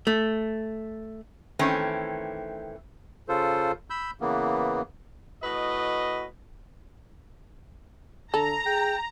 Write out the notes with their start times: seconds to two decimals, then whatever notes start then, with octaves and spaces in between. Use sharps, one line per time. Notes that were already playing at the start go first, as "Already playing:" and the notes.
0.07 A3
1.59 D#3 E3 A3 C4 C#4
3.28 C#3 F4 A4 C5
3.90 B5 E6 G6
4.21 C#3 E3 A#3 B3
5.43 A2 F#4 B4 D#5
8.34 D3 A4 A#5
8.66 G#4 G5